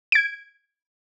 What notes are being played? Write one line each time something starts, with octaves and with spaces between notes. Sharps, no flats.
G#6 D7